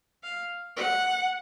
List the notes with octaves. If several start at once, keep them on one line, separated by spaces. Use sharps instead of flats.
F5
F#5